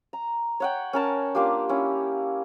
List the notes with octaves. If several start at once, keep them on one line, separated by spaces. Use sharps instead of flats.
A#5
C#5 F#5 G5
C#4 A#4 A5
A#3 D4 F4 G4
C#4 E4